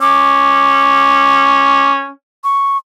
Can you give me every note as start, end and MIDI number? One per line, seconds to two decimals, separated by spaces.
0.01 2.10 61
0.01 1.92 86
2.44 2.77 85